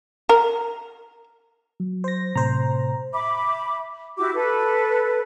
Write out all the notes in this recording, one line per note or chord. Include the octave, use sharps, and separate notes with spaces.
A#4
F#3
C5 A#6
A2 C3 C5 A#5
E5 B5 D6
E4 F#4 G4 D6
A4 B4